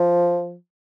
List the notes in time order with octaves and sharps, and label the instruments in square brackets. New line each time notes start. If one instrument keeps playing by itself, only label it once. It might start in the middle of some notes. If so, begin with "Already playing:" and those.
Already playing: [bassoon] F3